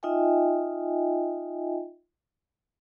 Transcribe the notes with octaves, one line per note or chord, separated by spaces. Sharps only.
D#4 F4 D#5 E5 G5 G#5